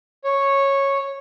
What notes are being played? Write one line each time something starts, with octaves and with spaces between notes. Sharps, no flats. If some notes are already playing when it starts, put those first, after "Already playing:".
C#5